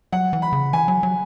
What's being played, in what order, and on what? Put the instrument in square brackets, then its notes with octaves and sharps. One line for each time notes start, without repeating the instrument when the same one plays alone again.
[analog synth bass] F#3 [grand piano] F#5
[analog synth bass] E3
[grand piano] B5
[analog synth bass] C#3
[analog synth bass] E3 [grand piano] G#5
[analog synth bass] F#3
F#3